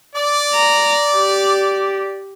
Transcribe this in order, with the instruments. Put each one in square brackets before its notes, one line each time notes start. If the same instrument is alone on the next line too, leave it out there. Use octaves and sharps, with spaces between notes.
[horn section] D5
[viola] A#5
G4